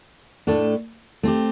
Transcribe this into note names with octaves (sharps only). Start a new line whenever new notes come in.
A2 A3 D4 A4
A3 C4 G4